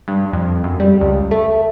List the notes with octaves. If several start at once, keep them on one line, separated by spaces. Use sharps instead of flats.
G2
F2
F#2
G3
C#2
A3